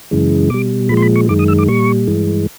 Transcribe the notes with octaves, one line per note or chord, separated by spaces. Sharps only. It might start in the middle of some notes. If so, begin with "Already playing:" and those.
F#2 C#3 E3 G#3
B2 G3 D6
A#2 F3 G#3 B5
C6
B5
C#6
F#2 D#3 G#3 D6
D#6
E6
D6
A#2 G3 C#6
G2 E3 G#3